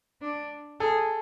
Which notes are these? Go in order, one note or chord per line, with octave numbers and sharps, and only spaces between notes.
D4
G#4 A4